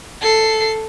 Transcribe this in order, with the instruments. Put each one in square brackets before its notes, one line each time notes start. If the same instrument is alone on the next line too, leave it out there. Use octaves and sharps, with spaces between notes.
[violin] A4 C7